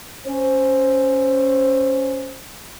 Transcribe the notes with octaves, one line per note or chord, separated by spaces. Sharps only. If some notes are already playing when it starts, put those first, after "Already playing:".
C#4 C5